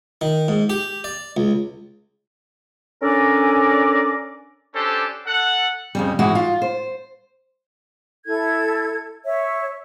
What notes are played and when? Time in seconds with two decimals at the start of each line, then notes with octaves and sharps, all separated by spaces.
0.21 D#3
0.48 G#2
0.70 G4
1.04 D5
1.37 C#2
3.03 C#4 D4 A4 A#4 D5 G#5
4.74 C#4 D4 G4 A4 C5
5.26 A4 F#5
5.95 F2 C#3 G3
6.19 G#2 E3 G#3 E4 F#4
6.35 F4
6.62 C5
8.26 E4 A4 G#6
9.26 C#5 E5